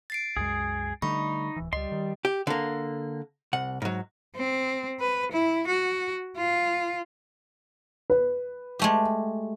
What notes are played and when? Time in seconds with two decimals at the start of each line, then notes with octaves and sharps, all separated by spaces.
0.10 A6 C7 D7
0.37 C2 F#2 G#3 G#4
1.02 D3 G3 A3 D#4 B5 C#6
1.56 D1 E3
1.73 C#2 G3 D#5 C6
1.92 D#3
2.25 G4
2.47 D3 A#3
3.53 C2 F#5
3.82 G#2 F#3
4.36 C4
5.00 B4
5.32 E4
5.67 F#4
6.37 F4
8.10 B4
8.79 G#3 A3 G4